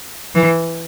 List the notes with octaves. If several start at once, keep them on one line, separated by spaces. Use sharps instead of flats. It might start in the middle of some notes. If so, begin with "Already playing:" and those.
E3